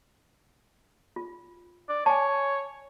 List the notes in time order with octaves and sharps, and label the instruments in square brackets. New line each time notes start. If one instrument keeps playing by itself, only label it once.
[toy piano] F4
[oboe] D5
[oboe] C#5 [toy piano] G#5 A5